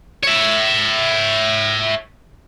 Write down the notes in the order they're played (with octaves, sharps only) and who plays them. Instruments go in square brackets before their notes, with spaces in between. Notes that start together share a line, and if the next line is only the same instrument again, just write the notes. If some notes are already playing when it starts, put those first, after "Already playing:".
[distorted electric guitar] C#5 E5